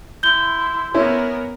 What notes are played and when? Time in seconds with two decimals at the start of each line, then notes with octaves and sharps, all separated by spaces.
0.23 E4 C6 G6 G7
0.94 B3 C#4 E4 A#4